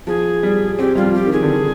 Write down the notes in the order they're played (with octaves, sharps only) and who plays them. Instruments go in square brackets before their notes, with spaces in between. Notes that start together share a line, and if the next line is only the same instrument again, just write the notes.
[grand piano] F3 [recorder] G#4
[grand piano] G3
[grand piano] C4 [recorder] G4
[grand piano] G3 [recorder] F4
[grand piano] F3
[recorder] G4
[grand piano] D#3
[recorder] G#4
[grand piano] D3
D#3